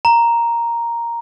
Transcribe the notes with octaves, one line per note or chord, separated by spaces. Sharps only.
A#5